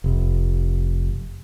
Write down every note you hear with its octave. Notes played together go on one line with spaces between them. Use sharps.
F1